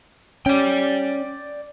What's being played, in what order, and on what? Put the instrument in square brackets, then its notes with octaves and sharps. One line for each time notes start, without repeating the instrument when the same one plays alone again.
[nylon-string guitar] C#4 [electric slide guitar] D5 G5